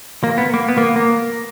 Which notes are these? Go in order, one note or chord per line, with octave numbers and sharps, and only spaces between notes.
A#3
B3
A#3
B3
A#3
A#3